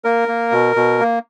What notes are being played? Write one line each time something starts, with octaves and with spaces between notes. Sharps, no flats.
A#3 A#4
A#3
B2
B2
A#3